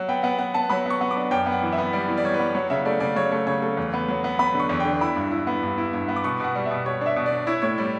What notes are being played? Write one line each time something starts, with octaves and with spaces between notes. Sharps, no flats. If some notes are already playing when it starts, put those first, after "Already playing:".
Already playing: F#3
B3 G5
B3 F#5
B3 F#5
B3 A5
F#3 B5
B3 C#6
B3
D6
D4
F#2 G5
B3
F#5
E3
E5
B3
G3 D5
E3
D5
G3 C#5
B4
B3
F#3 C#5
C#3 E5
A3 D5
C#3 D5
F#3 C#5
A3
C#3 C#5
A3
E2
B3
F#3
B3
B3 B5
D3
C#6
E2
D3 G5
E4 B5
G2
E4
B3
G2
E4
G2
B3
D6
B2 C#6
B2 F#5
G3
E5
B2
B2 C#5
D4 E5
B2
D5
D4
E4 C#5
A2 C#5
G3 D5